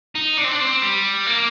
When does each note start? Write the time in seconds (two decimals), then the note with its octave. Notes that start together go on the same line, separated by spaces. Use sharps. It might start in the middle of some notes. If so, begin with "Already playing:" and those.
0.15 D#4
0.37 D4
0.44 C4
0.51 D4
0.60 C4
0.82 G3
1.26 A#3